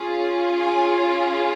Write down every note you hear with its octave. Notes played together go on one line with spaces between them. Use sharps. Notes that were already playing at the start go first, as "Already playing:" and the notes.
Already playing: C#4 F4 G#4
G#5